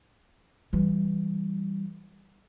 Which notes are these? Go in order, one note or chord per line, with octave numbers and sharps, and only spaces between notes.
E3 G3